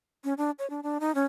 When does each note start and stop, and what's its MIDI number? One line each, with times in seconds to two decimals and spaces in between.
0.24 0.34 61
0.37 0.51 62
0.59 0.69 73
0.70 0.80 62
0.83 0.98 62
1.00 1.14 63
1.15 1.25 61